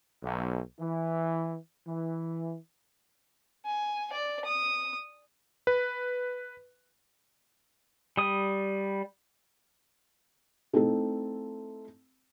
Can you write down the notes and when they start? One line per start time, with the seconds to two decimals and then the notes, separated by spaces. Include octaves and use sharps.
0.23 B1
0.79 E3
1.87 E3
3.66 G#5
4.13 D5
4.45 D#6
5.67 B4
8.17 G3 D#6
10.73 A3 C4 D#4 E4 A4